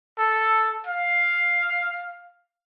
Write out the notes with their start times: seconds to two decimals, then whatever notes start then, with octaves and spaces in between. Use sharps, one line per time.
0.18 A4
0.86 F5